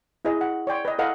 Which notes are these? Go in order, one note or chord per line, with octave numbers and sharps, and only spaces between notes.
E4 G#4 B4 D#5
F#5
C#5 D5 G5 C6
B4 D#5
E4 A4 B4 D#5 F5 F#5